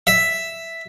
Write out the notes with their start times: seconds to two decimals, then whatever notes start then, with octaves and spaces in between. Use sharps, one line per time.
0.07 E5